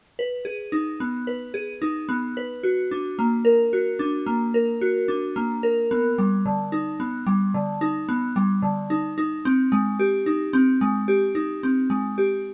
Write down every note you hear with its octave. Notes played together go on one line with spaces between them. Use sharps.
B4
G#4
D#4
B3
B4
G#4
D#4
B3
B4
F#4
D4
A#3
A#4
F#4
D4
A#3
A#4
F#4
D4
A#3
A#4
B3
G3
D3
D#4
B3
G3
D3
D#4
B3
G3
D3
D#4
D#4
C4
G#3
G4
D#4
C4
G#3
G4
D#4
C4
G#3
G4